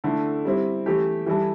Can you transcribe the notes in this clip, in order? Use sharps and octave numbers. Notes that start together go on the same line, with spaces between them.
D3 A3 E4 A4
G3 C4 E4
E3 A3 E4 G4
E3 G3 E4 A4